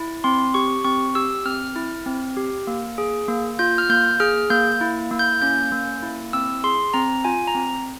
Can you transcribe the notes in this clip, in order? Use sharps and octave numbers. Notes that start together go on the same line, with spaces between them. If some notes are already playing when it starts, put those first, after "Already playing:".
Already playing: E4
C4 C6
G4 C#6
C4 C#6
G4 E6
C4 F6
E4
C4
G4
A#3
G#4
A#3
F4 G6
F6
A#3 G6
G#4 F6
A#3 G6
E4
A#3
G6
C#4 G6
A#3
E4
C4 E6
G#4 C6
C4 A#5
F4 G#5
A#5
C4